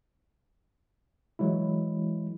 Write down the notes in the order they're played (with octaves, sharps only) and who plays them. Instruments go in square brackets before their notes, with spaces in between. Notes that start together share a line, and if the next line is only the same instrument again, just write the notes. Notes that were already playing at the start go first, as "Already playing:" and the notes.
[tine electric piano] E3 F#3 G#3 E4